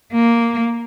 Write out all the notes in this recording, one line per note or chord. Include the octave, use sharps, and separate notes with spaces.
A#3